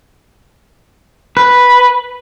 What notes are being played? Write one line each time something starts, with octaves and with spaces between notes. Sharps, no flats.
B4